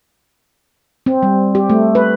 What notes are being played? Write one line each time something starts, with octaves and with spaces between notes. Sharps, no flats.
C4
G3
G4
A3
B4